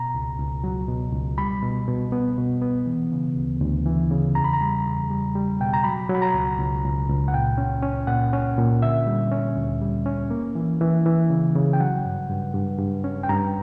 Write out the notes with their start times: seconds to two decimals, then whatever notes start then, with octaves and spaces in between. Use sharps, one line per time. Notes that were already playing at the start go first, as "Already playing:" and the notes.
Already playing: B2 A#5
0.15 C#2
0.39 C#2
0.64 F#3
0.88 B2
1.13 C#2
1.38 G3 B5
1.63 B2
1.88 B2
2.12 B3
2.38 B2
2.62 B3
2.86 E3
3.12 C#3
3.36 D2
3.61 D2
3.86 E3
4.11 C#3
4.35 E2 A#5
4.44 B5
4.53 A#5
4.61 G3
4.85 E2
5.10 G3
5.35 G3
5.60 B2 G5
5.74 A#5
5.84 F#3 B5
6.09 F#3
6.15 B5
6.22 A#5
6.34 C#2
6.58 C#2
6.84 C#2
7.09 C#2
7.28 F#5
7.34 A#2 G5
7.58 C#4
7.83 C#4
8.07 A#2 F#5
8.33 C#4
8.58 A#2
8.82 D3 E5
9.07 G3
9.31 C#4
9.57 D2
9.82 G3
10.06 C#4
10.31 A#3
10.55 E3
10.81 E3
11.06 E3
11.30 C#3
11.55 C#3
11.73 G5
11.80 F#3 F#5
12.05 G2
12.30 G2
12.54 G2
12.79 G2
13.04 C#4
13.24 G5
13.29 G2 A#5